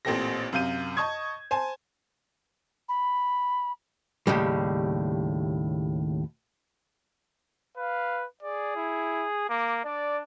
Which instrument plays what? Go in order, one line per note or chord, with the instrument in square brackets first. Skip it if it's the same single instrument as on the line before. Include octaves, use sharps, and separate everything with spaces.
[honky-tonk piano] A1 A#2 C4 G4 A4 A#6
F#2 C3 F5 G6 D#7
D#5 A5 C#6 D#6 G#6
C5 G#5 A5
[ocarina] B5
[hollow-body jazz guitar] D#2 A2 C#3 G3
[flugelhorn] B4 [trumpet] F5
[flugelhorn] G#4 [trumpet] D5
[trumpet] E4
[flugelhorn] A#3 [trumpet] D6
[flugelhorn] D4 [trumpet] D5